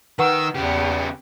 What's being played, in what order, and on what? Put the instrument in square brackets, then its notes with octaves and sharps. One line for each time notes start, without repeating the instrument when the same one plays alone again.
[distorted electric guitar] D#3 [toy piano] B4 F#5 C#6 [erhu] E6
[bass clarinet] E2 [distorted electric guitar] C#3 B3 [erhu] G4